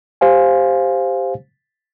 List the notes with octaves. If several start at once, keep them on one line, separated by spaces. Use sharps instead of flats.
G4 C5 F5 G#5